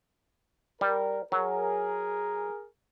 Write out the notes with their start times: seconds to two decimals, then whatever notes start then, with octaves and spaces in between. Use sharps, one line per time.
0.81 G3 A#4
1.32 F#3 G#4 A#4